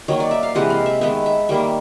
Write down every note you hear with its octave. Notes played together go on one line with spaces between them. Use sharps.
D#3 F#3 A#3 C#5
D5
E5
F5
C3 E3 G#3 F#5
F5
E5
D#3 G#3 B3 E5
E5
D#3 G3 A#3 E5